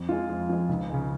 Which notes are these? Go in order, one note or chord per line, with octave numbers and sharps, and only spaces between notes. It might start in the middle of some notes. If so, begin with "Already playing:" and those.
Already playing: F2
F3 G#3 F4
F2
F3 G#3
C#2 D#4
C#3 G#3